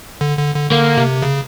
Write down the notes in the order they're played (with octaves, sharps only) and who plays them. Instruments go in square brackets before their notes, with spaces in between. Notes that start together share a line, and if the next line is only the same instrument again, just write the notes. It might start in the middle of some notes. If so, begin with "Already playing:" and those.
[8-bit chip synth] D3
D3
D3
[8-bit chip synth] D3 [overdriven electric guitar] A#3
[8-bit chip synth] C3
C#3